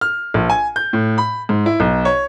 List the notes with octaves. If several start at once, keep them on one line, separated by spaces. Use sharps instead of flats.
F6
A#1
G#5
G6
A2
B5
G#2
E4
B1
C#5